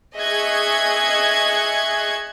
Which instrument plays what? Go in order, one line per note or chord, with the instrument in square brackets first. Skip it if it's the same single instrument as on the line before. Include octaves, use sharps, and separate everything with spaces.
[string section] G#4 D#5 E5 C#6 F#6 G#6